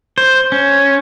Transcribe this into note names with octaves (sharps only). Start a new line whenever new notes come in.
C5
C#4